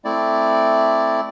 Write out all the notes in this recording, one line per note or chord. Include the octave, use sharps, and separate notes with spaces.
A3 C4 E4 D5